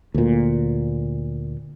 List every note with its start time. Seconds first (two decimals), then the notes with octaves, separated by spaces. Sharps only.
0.14 D2 A#2